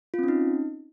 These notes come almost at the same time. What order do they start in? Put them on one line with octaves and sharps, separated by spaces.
F4 C4 C#4 D#4